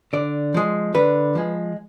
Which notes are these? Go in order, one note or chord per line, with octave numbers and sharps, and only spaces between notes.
D3 D5
F3 G#3
D3 B4
F3 G#3